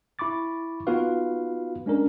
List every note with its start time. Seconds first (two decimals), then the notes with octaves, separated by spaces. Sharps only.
0.19 E4 B5 C#6 D6 A6
0.87 B3 D#4 F4 F#4 B4 F5
1.86 G#3 C#4 D4 A#4